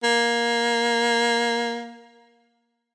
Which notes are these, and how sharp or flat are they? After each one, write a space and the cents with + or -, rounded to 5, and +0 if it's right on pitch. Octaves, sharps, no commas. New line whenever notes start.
A#3 +15